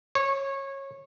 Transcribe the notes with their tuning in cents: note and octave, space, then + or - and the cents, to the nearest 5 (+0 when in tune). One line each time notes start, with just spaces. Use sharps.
C#5 -20